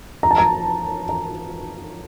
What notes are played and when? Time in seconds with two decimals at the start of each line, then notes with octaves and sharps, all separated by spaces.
0.23 A#5
0.31 A5
0.38 A#5
1.09 A#5